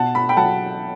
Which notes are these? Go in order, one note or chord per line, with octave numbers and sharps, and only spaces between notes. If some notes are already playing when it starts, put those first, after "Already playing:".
Already playing: B2 F#5 A5
B5
G5 B5
F#3 F#5 A5